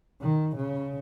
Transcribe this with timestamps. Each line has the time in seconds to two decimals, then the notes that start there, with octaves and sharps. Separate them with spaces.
0.21 D#3
0.57 C#3